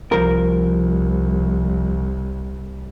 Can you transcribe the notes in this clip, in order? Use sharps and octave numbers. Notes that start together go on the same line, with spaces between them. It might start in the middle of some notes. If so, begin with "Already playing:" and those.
C2 F3 A#4